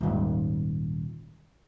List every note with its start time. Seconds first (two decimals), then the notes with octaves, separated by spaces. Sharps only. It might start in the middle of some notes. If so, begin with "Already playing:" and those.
0.01 D#1 G#1